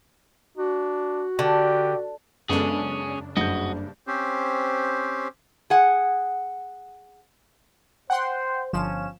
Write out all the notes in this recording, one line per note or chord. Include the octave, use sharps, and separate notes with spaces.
D4 F#4
D3 G4
F#2 C#3 G#3 B3 C#4 D4 G#4 A4
F#1 G2 F#4 D#5 G6
C4 C#4 G4 C5
G#4 F#5
C5 F#5 G5 C6
G1 F3 C#4 E7